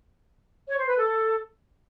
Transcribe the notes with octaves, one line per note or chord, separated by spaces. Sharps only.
C#5
C5
B4
A4